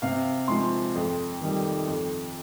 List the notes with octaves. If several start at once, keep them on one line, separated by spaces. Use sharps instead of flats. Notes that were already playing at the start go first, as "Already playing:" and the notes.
C3 F5
F3 G#3 C6
F2
D#3 G3
F2